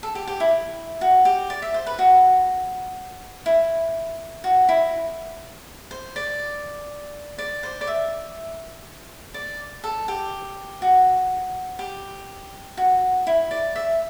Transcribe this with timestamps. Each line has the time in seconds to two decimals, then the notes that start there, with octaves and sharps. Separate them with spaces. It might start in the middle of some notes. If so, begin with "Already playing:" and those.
0.03 A4
0.15 G4
0.27 G4
0.40 E4
1.01 F#4
1.25 G4
1.50 D5
1.62 E5
1.74 C5
1.87 B4
1.99 F#4
3.46 E4
4.44 F#4
4.69 E4
5.91 C5
6.16 D5
7.38 D5
7.63 C5
7.81 D5
7.87 E5
9.34 D5
9.84 A4
10.08 G4
10.82 F#4
11.79 G4
12.77 F#4
13.27 E4
13.51 D5
13.76 E5